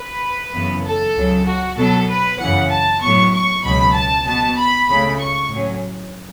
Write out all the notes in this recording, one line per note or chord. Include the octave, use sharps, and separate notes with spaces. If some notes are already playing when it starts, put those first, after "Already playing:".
Already playing: B4
F#2 C#3 E3 B3
A4
C#2 C#3 F#3
F#4
B2 F#3 B3 A4
B4
F#2 C#3 E3 F#5
A5
A2 F#3 B3 C#6
C#6
C#2 B2 F#3 B5
A5
B2 B3 A5
B5
C#2 C#3 A3 B5
C#6
A2 F#3 C#4